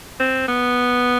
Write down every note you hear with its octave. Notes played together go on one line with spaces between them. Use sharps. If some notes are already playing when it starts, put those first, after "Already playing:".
C4
B3